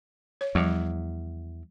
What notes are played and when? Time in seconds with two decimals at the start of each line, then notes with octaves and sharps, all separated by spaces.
0.41 C#5
0.55 E2 F3 G3